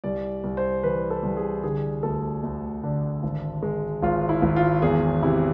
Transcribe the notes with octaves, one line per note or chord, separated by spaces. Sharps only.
C2 D5
C2
C5
E3 B4
A4
C2
G#4
D3 G#4
D2 A4
D2
D3
G#1
G#3
G#1 F4
E4
G#1
F4
E2 G#4
C3 E4